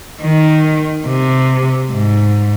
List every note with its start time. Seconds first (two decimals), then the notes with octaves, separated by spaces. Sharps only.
0.22 D#3
1.08 C3
1.92 G#2